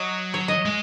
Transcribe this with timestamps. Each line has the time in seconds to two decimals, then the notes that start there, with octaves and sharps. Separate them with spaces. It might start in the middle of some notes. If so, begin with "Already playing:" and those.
Already playing: F#3 D#5
0.34 C#5
0.48 D#5
0.65 G#3